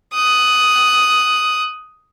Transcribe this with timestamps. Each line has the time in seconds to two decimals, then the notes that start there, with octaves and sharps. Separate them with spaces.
0.14 D#6 F#6